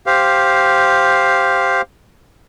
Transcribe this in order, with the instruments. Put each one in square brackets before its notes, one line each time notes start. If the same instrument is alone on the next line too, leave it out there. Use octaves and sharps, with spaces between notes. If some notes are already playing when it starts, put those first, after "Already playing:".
[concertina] G4 C5 F5